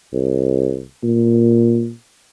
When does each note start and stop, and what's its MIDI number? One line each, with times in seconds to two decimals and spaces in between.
0.13 0.83 36
1.03 1.91 46